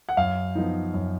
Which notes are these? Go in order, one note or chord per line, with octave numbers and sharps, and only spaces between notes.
F#5
F#2 F5
F3 B3 D#4
F#2